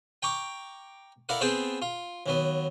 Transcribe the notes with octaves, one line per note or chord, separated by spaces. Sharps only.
G5 A#5 C#6 D6
E4 A4 A#4 D5 F5 F#5
B3 C4 G#4 C5 G5 A5
F4
D#2 F#3 B3